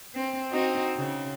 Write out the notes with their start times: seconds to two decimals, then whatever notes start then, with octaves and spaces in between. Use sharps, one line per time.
0.15 C4
0.51 C4 D#4 F#4
0.97 C#3